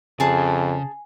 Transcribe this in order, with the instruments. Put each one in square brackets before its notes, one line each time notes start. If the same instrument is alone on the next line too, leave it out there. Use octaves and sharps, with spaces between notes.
[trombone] F2 [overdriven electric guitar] C#3 [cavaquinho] G#4 A5 [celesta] G#5